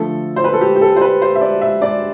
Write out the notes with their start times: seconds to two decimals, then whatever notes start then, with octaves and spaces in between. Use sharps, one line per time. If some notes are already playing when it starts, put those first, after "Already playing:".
Already playing: D3 F3 A3 A4
0.36 C5
0.44 B4
0.53 A4
0.61 G4
0.75 G4
0.82 A4
0.96 C5
1.01 B4
1.22 C5
1.35 E5
1.41 D5
1.61 E5
1.82 D5